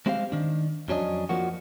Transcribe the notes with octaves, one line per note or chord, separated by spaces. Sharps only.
G#3 C4 E4 G4 C5 F5
D#3 D4
F2 F#3 C#4 D4 D#5
F2 F3 A#3 F#4